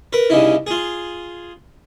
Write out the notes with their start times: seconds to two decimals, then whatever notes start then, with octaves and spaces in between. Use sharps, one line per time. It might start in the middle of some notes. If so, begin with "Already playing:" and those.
0.13 A#4 B4
0.30 C2 C#3 D#4 E4
0.67 F4 G#4